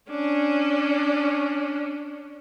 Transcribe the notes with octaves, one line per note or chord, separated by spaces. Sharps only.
C#4 D4